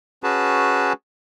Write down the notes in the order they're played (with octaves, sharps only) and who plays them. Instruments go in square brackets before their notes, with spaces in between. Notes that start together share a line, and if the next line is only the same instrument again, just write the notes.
[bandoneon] C#4 F#4 G#4 B4 A5